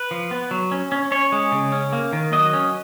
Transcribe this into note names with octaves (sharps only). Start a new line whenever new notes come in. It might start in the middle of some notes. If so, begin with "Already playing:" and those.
Already playing: B4
F3
B3
F#3
C#4
C#4
C#4 C#5
G#3
C#3
C#4
A#3
D#3
F#3 D#5
C#4